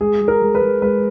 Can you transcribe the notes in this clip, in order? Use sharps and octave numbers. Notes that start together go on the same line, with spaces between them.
G#3 G#4
G#3
A#4
G#3
B4
G#3
G#3 B4